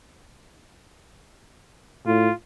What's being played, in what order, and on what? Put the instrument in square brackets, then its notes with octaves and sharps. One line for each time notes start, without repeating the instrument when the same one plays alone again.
[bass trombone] A2 [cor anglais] F4